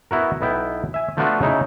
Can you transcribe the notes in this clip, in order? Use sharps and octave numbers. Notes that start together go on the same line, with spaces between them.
B3 E4 F#4 A#4
B1 B3 E4 G5
E5 G#5
F3 A3 B3 D4 F4 F#4
C#3 D#4 E4